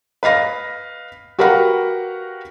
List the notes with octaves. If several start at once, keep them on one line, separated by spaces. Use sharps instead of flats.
B4 D#5 F5 A#6
F#4 G4 A#4 B4 F5 F#5